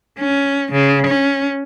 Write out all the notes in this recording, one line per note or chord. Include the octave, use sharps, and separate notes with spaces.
C#4
C#3
C#4